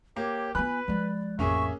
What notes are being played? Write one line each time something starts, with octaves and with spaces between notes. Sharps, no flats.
A#3 G4 C#5
B3 F4 B4 G#5 B5 F#6
F3 G#3 D5
A1 F2 A#3 C#4 G#4 E5 C#6